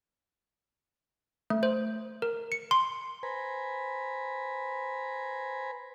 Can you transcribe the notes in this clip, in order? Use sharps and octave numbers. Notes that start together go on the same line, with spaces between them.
A3
C5
A#4
C#7
C6
B4 C5 G#5 A#5 B5